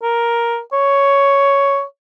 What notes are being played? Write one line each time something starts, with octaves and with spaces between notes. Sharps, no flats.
A#4
C#5